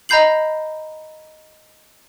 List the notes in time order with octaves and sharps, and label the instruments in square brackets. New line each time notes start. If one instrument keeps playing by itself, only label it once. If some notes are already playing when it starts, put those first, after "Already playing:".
[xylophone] D#5 A#5 B5 G6 C7 F#7